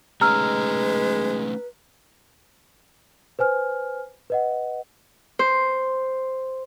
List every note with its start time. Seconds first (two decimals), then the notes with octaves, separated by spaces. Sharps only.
0.21 G#3 A3 C#4 D#4 B4 A#5 E6 F6
3.39 B4 C5 G#5 F6
4.30 B4 D#5 F#5
5.39 C5